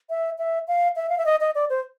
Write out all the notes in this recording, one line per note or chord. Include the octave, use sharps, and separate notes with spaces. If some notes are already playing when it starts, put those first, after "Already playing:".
E5
E5
F5
E5
F5
E5
D#5
D#5
D5
C5